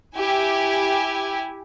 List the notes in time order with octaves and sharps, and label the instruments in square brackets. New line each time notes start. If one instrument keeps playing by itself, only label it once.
[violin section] E4 G4 G#5